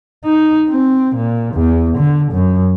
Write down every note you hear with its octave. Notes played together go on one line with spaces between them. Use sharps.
D#4
C4
A#2
E2
D3
F#2